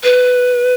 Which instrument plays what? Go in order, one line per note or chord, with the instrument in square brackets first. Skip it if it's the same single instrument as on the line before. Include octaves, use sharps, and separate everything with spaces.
[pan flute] B4